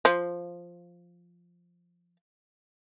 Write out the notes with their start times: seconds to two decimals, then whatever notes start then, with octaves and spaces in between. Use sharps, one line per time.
0.05 F3 F4